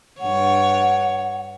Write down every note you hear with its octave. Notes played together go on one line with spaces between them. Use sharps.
G2 C#5 F#5